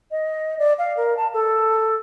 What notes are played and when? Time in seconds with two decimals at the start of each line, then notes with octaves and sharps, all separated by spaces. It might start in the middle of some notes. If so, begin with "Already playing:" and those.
0.11 D#5
0.58 D5
0.78 F5
0.96 A#4
1.17 A5
1.33 A4